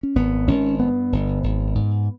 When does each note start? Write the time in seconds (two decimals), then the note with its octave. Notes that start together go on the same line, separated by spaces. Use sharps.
0.03 C#4
0.15 G#1 B3
0.47 G#1 C#4
0.79 G2 B3
1.12 G1
1.43 G#1
1.75 G#2